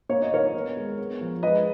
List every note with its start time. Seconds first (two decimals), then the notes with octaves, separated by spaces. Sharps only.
0.09 A#3 C#5
0.22 D#5
0.32 D#3 A#4 C#5
0.54 B3
0.77 G#3
0.99 B3
1.21 F3
1.42 G#3 B4 D#5